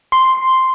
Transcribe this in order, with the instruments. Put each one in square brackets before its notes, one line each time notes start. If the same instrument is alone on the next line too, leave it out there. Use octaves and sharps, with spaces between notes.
[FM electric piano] C6